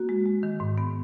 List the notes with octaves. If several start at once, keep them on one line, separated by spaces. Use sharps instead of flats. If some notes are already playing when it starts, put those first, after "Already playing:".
Already playing: A#3 F#4
G#3
G#3
D#3
G#2
B3